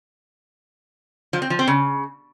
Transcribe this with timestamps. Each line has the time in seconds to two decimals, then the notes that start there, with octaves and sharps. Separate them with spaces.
1.33 F3
1.42 C4
1.50 F3
1.59 C4
1.68 C#3